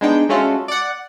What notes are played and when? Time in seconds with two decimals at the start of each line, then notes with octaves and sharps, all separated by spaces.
0.01 G#3 B3 D4 D#4 G5
0.29 G#3 A3 C#4 F4 F#4 A4
0.68 D5 F#5